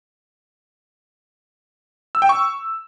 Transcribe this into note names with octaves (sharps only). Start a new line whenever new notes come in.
E6
G5
C#6